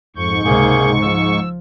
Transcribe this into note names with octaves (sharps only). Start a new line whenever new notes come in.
F2 G#2 C#6 G6
C#2 C3 A#3 G#4 G6
F3 E6